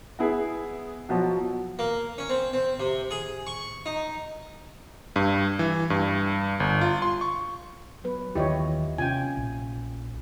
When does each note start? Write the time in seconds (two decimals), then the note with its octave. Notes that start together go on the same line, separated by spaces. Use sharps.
0.19 B3 E4 G#4
1.09 B2 F3 F#3
1.79 A#3
2.18 C#4
2.29 C4
2.53 C4
2.80 C3
3.11 G#4
3.47 C#6
3.86 D#4
5.16 G2
5.59 E3
5.90 G2
6.60 G1
6.81 F4
7.02 C6
7.21 C#6
8.04 F#3 B3 B4
8.35 D#2 D#3 E3 E4 F4 G4 C#5 D#5
8.98 C3 C#4 F4 G5 G#5
9.37 A#1